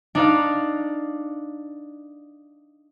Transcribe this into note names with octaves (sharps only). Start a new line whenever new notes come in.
D4 D#4 D5 F5